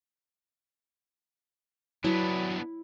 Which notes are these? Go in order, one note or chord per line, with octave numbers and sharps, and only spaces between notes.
F#3 B3 D4 E4